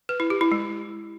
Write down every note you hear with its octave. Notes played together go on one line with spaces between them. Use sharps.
B4
E4
G4
E4
G#3